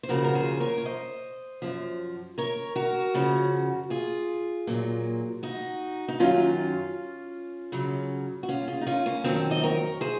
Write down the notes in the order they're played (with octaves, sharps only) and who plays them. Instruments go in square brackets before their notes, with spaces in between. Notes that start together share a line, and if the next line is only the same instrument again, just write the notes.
[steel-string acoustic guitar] C5
D#2 C#3 F3 F#4 A#4
A#4
G#4 C5
A#4 C#5
C#5
C5 D#5
F#2 F3
A#4 C#5
F#4 A#4
F#2 C#3 F3
F4 G#4
A#2 F#3
D#4 F#4
D#4
F#2 D#3 F#3 C#4 F4
F#2 C#3 F#3
F#4
C#4 F4
F4 G#4
D#4
C#4 F4
A#3 C#4
F2 D#3 F#3 C4 D#4
D#5
A#4 C#5
G#4 C5